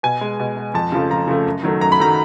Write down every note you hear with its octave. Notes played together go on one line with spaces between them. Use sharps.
B2 G#5
G#3
B2
G#3
F2 A5
C#3 F3 A3
F2 A#5
C#3 F3 A3
F#2
D#3 F#3 A3
F#2 A#5
B5
D#3 F#3 A3 A#5